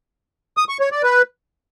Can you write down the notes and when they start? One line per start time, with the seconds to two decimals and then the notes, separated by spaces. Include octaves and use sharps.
0.57 D#6
0.69 C#6
0.80 C#5
0.92 D5
1.03 B4